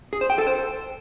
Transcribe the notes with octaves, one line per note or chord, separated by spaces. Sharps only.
G#4
C5
G5
A4
C5